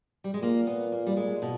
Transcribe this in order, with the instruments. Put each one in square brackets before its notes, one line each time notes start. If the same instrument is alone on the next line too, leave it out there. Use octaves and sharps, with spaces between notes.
[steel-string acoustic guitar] G3
G#3
[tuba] A#2 [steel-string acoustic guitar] A#3
[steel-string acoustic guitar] B3
A#3
G3
G#3
B2